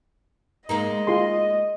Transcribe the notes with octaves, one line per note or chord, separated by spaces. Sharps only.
G#3 A#3 D#4 D#5
F4 G#4 C6